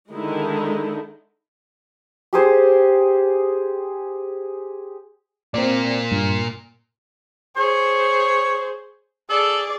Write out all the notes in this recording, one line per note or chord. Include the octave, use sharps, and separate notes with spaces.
D3 D#3 G#3 D#4 E4
G4 G#4 C5
A#2 A#3 C4 D5
G2
G#4 C5 C#5
G#4 A4 D5